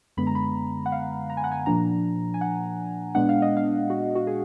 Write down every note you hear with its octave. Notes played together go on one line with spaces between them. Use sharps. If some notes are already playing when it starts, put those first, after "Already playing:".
F#2 D3 G#3 B3 B5
A#5
B5
F#5
F5
A#5
G#5
F#5
G#5
A#2 F3 A#3 D4 A#5
G#5
F#5
A#2 G#3 B3 D4 F#5
F5
D#5
F5
F#4
F#4
G#4